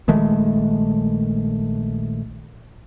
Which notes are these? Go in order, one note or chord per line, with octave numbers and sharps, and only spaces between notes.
A#1 D#3 G#3 A3